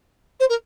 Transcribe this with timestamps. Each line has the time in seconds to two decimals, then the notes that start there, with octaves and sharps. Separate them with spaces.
0.40 C5
0.50 A#4